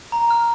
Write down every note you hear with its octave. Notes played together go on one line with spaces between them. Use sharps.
A#5
F6